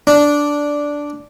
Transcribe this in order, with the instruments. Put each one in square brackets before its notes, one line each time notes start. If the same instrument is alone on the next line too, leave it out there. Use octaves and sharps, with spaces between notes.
[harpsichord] D4